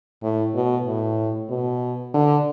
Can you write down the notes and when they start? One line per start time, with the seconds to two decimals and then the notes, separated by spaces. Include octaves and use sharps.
0.23 A2
0.55 B2
0.86 A2
1.50 B2
2.14 D3